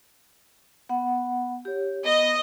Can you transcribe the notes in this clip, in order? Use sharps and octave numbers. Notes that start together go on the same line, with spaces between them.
B3 F#5
G4 C#5
B3 D#5